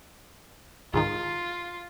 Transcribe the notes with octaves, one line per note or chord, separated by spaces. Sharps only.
C#2 G#2 D#3 F4